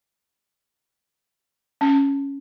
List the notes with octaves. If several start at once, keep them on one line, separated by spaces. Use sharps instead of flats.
C#4